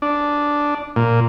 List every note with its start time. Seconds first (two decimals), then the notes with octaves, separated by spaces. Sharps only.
0.02 D4
0.96 A#2